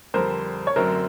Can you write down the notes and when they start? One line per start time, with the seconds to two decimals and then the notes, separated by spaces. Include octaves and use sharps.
0.14 F2 D3 G3 A#4 C5
0.67 C#5
0.76 F#2 D3 F#3 A3 C4 A#4 C5